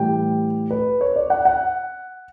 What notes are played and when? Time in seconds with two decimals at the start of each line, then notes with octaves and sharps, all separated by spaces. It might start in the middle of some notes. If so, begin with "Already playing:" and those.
Already playing: A2 E3 G3 G5
0.71 B4
1.01 C#5
1.16 D5
1.30 F#5
1.45 F#5